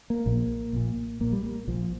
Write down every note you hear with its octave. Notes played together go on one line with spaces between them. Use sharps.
A#3
A#1 A#2
A#1 A#2
A#1 A#2 A#3
G3
A#3
A#1 A#2 F3